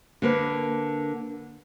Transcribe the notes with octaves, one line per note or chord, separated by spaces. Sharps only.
D3 A#3 B4